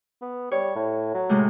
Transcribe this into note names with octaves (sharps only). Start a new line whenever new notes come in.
B3
G3 C#5
A2
F#3
A2 C3 G#3